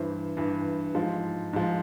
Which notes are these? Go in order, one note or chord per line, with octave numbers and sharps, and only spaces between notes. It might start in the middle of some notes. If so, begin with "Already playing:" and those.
Already playing: G2 E3 C5
G2 E3
G#2 F3
G#2 F3